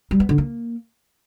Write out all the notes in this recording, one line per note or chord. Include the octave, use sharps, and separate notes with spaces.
G3
B3
D3
A#3